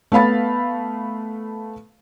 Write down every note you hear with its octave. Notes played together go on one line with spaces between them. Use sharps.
A3 B3 F5 B5 A6